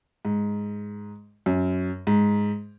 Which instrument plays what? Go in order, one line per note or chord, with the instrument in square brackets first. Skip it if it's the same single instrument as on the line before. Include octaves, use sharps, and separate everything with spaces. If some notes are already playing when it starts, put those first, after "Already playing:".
[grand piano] G#2
F#2
G#2